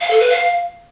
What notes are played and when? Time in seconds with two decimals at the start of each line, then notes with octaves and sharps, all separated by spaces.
0.01 F5
0.11 A4
0.20 B4
0.30 F5